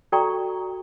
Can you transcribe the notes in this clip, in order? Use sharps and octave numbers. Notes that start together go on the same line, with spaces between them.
F#4 A4 D5 G5 A#5 C#6